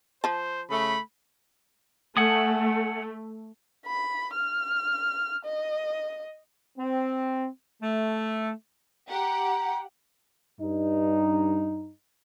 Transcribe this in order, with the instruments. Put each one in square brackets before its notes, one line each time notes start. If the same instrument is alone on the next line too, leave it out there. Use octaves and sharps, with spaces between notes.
[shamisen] F3 A5 [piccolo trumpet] C5
[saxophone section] C#3 A3 [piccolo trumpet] B5
[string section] A3 [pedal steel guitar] F#5 G#5 D#6
[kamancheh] B5
F6
D#5
[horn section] C4
A3
[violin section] G4 F#5 [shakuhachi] A#5
[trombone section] G2 D#4